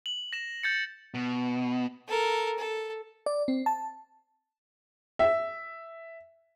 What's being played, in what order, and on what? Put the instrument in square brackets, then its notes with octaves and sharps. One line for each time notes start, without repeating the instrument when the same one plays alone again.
[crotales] F#7
A#6 E7
G6 A6 C#7
[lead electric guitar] B2
[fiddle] A4 A#4
A4
[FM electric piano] D5
C4
A5
[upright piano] E5